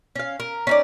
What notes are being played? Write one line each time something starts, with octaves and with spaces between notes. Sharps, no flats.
C#4 F5
A#4
C#4 D#4 D5